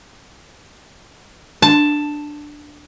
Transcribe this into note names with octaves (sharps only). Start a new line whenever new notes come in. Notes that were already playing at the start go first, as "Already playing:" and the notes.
D4 A5